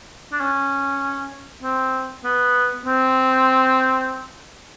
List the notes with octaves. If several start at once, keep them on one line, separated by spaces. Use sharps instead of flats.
D4
C#4
C4
B3
C4